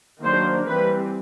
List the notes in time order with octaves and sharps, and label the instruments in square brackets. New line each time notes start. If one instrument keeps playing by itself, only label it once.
[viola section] D#3 F#3 A#3 D4 C5
E3 G3 C4 B4